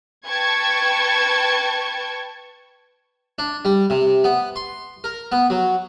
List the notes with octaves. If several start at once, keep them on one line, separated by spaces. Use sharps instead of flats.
B4 G5 A5 C#6 G#6
D4
G3
C3
B3
C6
A#4
B3
F#3